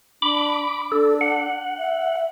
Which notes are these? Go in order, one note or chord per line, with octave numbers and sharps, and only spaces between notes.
D4 B5 D6
D4 A4
F#5
E5